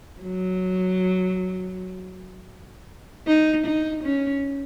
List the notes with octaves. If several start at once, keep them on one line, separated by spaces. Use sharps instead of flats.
F#3
D#4
D#4
C#4